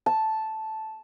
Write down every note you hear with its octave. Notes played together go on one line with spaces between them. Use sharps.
A5